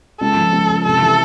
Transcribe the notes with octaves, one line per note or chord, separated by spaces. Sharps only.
C#2 A4
F3
C#2
C#2
C3 A4
E3